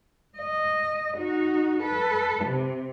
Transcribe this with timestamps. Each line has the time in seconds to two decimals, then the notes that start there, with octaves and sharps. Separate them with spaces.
0.38 D#5
1.17 D#4 F#4
1.81 A4 B4
2.45 C3